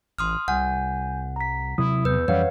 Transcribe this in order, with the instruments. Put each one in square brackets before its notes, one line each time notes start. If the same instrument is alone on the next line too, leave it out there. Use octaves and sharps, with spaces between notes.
[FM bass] A1 [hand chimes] C6 D#6 F6
[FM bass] C2 [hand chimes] F#5 [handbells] G#5 G6
[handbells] A#5 B6
[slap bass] C3 F#3 [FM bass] E4 [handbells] D#6
[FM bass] E2 [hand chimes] B4 [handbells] E6 G6
[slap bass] F2 E3 C#4 [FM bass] G3 [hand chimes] B4 [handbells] C#5 F5 F#5